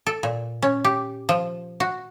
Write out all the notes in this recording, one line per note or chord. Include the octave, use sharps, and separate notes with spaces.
A4
A#2
C#4
G4
F3
F#4